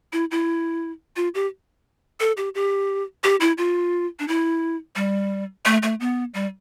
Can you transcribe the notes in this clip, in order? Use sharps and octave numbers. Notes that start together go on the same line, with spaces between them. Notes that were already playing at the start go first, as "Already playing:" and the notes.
E4
E4
F4
G4
A4
G4
G4
G4
E4
F4
D4
E4
G3
A3
A3
B3
G3